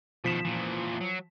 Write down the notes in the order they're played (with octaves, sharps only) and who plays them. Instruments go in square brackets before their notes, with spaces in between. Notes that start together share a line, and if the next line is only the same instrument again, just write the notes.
[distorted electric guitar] B2 D#3 [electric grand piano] F3 B6 E7
[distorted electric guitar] A#2 E3
F#3